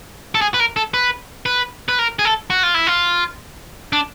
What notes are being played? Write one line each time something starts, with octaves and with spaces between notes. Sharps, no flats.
A4
G#4
B4
A#4
A4
B4
B4
B4
A#4
G#4
A4
F#4
F4
E4
F4
D4